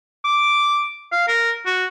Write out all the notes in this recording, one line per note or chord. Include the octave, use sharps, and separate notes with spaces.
D6
F5
A#4
F#4